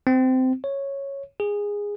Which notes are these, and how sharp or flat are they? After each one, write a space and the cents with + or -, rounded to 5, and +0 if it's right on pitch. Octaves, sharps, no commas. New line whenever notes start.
C4 -20
C#5 -5
G#4 -15